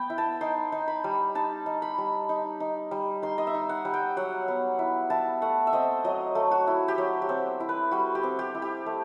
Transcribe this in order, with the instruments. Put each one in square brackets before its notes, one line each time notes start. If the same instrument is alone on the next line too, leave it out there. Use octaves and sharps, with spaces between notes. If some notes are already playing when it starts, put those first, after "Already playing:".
Already playing: [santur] B3 G5
E4
A5
D#4 C6
D#4
B5
G3
D#4 A5
D#4
B5
G3
D#4
D#4
G3
D#4 C6
D#5
E5
D#4
F#5
G3
G5
F#3 F#5
B3
E4
E4 A5
A3 F#5
E5
C4 D#5
F#3 D#5
A3
F#4
E4
G4
F#3 F#4
G4
C4
E4
B4
G3 F#4
G4
C4
G4
E4
G4
A3